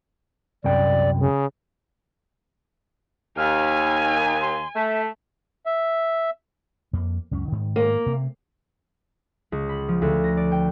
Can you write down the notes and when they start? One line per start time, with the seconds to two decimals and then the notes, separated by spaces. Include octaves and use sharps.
0.64 C2 F#2 D5 G5
1.20 C#3
3.37 D#2 G#5 F6
4.41 C6
4.75 A3 E5
5.66 E5
6.93 F2 A#3
7.31 C#2 F#2 C#4
7.48 G#2 D#3
7.76 A#3
8.06 C3
9.52 C#2
9.69 B5
9.88 F3
10.02 D2
10.24 A#6
10.37 D5
10.52 G5